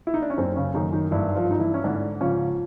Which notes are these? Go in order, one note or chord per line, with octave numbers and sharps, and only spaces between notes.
E4
D#4
D4
C#4
F#2 C4
C#3 C#4
F#2 D#3 D#4
D#3 D#4
G2 E3 E4
F3 F4
G2 D#4
E3 E4
C#4
G#2 D3 D4
C#3 F3 C#4